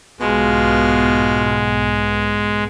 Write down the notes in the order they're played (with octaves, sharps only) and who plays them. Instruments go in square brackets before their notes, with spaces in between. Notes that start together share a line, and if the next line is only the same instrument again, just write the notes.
[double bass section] B1 G#2 B3 [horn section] B2 F4 [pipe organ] G#3